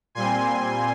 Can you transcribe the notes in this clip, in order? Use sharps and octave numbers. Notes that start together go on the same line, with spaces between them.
A#2 G3 C4 G#5 C6